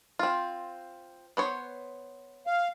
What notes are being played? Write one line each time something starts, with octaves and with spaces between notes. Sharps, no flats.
C4 F4
B3 C5 C#5
F5